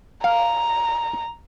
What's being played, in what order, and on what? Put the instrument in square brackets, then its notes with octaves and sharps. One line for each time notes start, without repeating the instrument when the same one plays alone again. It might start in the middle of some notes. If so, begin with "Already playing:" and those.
[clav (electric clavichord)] F5 [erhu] A#5